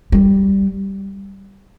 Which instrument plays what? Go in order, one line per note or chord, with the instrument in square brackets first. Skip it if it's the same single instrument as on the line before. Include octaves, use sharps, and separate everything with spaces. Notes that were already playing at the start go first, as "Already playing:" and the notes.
[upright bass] G3